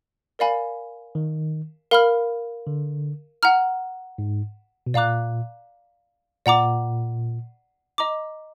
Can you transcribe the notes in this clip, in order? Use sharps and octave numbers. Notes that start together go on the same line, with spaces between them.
A#4 D5 F5 G#5 B5
D#3
A#4 F5 B5 F6
D3
F#5 A#5 F6
G#2
B2
A#2 D5 F5 A#5 D6 F#6
A#2 D5 F#5 A#5 D6
D#5 A#5 D6